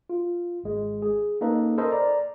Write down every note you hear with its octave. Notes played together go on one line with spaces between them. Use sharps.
F4
G#1 G#3
G#4
A#3 C#4 D#4 A4 B4
A4 A#4 C5 D#5 B5
D5 A#5